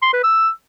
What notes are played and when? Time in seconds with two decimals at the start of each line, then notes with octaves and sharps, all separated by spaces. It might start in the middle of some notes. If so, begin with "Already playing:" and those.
0.02 C6
0.13 B4
0.24 E6